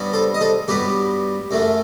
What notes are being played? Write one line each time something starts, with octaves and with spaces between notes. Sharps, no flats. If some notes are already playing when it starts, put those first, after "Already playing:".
Already playing: G2 F#3 B3
A4 C5
D#5
A4 C5
G2 F#3 B3 G4 B4
F#2 F#3 A3